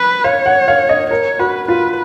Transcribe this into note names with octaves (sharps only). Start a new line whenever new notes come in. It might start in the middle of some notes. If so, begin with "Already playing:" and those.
Already playing: B4
C#5 F5
F#5
F5
D#5
A#4 C#5
F#4 B4
F4 B4